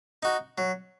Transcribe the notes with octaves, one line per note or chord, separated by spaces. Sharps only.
D#4 F#4
F#3